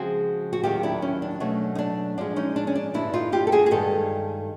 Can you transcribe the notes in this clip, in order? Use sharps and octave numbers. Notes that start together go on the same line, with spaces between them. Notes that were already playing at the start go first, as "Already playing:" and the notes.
Already playing: C#3 F3 G#3 C4 F#4 G#4
F#4
D#2 D#3 F#3 F4 G4
D4 E4
C#4
D4
B2 F#3 A3 C#4
D#4
D4
G#2 F3 G#3 D4
C#4 D#4
D4
C#4
D4
G2 D3 G3 D4 E4
D#4 F4
F4 G4
A4
F#4 G#4
G#4
G2 D#3 G#3 G4 A4